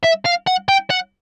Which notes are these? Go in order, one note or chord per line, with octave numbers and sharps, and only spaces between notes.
E5
F5
F#5
G5
F#5